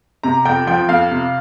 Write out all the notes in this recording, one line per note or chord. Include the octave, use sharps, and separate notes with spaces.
C3 A#5
F2 G5
F3 G5
F2 F5
C3